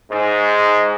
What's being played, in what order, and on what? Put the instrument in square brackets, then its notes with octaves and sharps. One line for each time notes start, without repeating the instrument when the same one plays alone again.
[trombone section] G#2